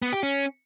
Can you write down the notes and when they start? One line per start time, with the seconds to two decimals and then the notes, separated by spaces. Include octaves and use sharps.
0.02 B3
0.13 G4
0.23 C#4